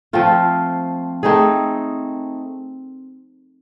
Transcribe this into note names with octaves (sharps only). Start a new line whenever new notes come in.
F3 A3 C4 F4
A3 C4 D#4 G#4